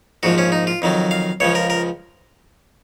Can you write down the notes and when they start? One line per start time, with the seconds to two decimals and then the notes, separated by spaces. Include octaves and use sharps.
0.23 A#1 G#2 F3 F#4
0.38 C#4
0.52 D#4
0.67 F4
0.82 F2 D#3 F#3
1.11 F5
1.40 C#2 C#3 F3 C#5
1.55 A#4
1.70 A#4